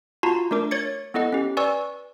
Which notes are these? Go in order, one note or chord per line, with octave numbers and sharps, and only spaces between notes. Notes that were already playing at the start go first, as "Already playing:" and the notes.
F4 F#4 A5 A#5
A3 D4 A#4 D6
C#5 G#6 A6 C#7
B3 E4 A4 D#5 F#5
C#4 G4
B4 D5 G#5 C#6 E6